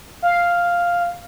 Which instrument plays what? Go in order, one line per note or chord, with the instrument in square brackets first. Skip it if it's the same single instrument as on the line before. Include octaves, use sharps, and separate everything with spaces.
[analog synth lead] F5